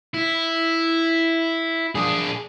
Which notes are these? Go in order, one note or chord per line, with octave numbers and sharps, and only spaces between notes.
E4
D4 G#4